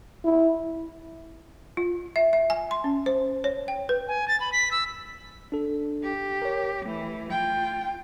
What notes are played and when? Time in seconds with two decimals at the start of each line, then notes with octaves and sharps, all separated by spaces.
0.24 E4
1.77 F4
2.16 E5
2.33 E5
2.50 G#5
2.71 C6
2.84 C#4
3.06 C5
3.44 C#5
3.68 G5
3.89 B4
4.08 G#5
4.28 A6
4.40 B5
4.52 B6
4.71 E6
5.52 D4 A4
6.04 G4
6.42 A#4 C#5
6.86 E3 A3
7.31 F4 G5